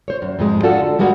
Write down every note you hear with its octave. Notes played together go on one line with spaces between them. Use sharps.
C5 C#5
F#2
F2 G#2 G#3
D4 F4 F#4 A4
D3
G#2 G3 G#3 A#3 F#4